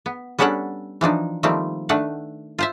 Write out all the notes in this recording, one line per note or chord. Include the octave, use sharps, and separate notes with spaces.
B3
G3 B3 C#4 D4 A4 F#5
E3 F3 D4 D#4
D#3 F3 G3 A3 A#3 C4
D#3 A3 D4 B4 F#5
F4 C5 E5